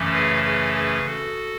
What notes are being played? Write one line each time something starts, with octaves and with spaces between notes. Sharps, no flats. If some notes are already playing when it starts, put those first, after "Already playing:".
Already playing: F#2 C#3 E3 A3 C#4
G#4 B4
G#4 B4
G#4 B4
F#4 A4